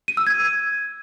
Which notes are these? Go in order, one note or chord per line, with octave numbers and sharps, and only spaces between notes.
D#7
E6
G#6